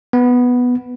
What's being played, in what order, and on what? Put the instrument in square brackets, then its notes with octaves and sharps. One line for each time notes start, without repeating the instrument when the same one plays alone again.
[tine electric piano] B3